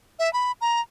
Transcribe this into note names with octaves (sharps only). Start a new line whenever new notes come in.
E5
B5
A#5